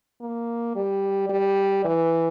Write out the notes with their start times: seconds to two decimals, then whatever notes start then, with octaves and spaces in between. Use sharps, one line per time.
0.21 A#3
0.76 G3
1.30 G3
1.84 E3